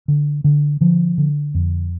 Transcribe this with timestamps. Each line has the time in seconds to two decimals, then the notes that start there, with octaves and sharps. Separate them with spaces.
0.08 D3
0.44 D3
0.81 D3 F3
1.18 D3
1.54 F2